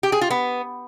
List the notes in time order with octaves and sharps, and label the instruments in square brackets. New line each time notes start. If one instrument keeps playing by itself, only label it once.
[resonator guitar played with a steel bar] G4
G#4
F4
B3